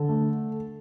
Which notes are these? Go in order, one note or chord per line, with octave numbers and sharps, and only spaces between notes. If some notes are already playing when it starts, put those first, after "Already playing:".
Already playing: D3 A4
A3